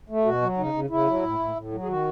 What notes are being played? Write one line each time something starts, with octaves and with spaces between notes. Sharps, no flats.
A3
B2 F#4
F#3
C#3 D#4
C#3
C#3 E4
F#3
A2
A2
A2
F#3
G#4
D#3 F#4